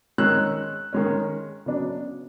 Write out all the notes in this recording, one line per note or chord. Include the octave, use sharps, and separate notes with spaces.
D#3 G#3 C#4 E6 F#6
D#3 G#3 C#4
C#3 F#3 B3 D4